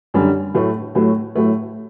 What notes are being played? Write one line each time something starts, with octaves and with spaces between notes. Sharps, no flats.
F#2 D3 G3
A2 F#3 A3
A2 F#3 A3
A2 F#3 A3